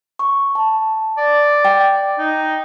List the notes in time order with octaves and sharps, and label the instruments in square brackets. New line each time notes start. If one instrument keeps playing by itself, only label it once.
[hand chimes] C#6
A5
[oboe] D5
[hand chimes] G5
[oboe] D#4